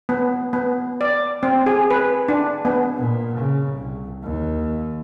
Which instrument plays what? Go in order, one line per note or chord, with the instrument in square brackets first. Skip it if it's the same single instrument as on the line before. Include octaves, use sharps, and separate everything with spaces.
[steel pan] B3
B3
D5
C4
G#4
B4
D4
B3
[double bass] A#2
C#3
C2
D#2